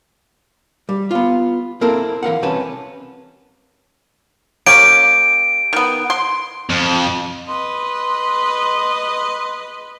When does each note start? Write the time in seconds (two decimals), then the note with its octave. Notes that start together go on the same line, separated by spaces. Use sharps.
0.89 G3
1.11 B3 F4
1.81 A#3 C4 E4 A4 A#4
2.23 E3 A#4 F5 F#5
2.42 C2 C3 C#4 B4 A5
4.66 A#3 C#4 G4 D7
5.73 D#3 B3
6.10 C6
6.69 F2
7.47 B4 D#5 C6